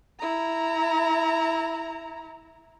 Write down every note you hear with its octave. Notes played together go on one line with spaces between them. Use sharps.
E4 A#5